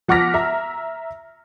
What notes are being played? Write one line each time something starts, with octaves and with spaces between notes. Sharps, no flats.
F3 F#5 D6 F6 A#6 B6
E5 A#5